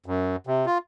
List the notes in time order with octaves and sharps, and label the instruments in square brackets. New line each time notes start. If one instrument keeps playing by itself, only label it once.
[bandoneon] F#2
C3
F4